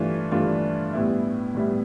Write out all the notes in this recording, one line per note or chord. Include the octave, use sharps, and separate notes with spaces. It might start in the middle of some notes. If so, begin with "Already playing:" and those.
Already playing: G2 E3 A3 D4 F4
G2 E3 A3 D4 F4
A2 G3 B3 E4
A2 G3 B3 E4